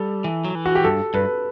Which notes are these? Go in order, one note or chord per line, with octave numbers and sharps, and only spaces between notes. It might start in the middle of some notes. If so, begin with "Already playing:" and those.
Already playing: G3 A4
E3
F#3
E3
F#4
G4
G2 A4
G2 B4